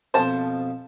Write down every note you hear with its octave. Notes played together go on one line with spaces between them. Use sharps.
F2 B2 F3 C5 A5